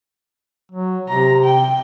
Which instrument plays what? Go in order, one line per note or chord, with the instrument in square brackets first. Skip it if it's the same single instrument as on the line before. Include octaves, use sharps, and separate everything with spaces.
[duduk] F#3
[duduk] C3 [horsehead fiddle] A#5
[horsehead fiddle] G5